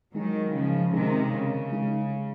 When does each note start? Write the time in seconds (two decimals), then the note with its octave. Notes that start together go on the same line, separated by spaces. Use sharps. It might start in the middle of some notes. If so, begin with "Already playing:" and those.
0.15 D#3 F#3 G#3 D#4 G#4
0.54 C#3 F3
0.93 C3 D#3 G#3 D#4 G#4
1.33 C#3
1.72 G#3 D#4 G#4